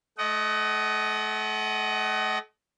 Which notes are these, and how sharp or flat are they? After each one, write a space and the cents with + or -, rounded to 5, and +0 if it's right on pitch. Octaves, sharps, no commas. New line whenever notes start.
A3 -35 D#5 +0 F#5 +35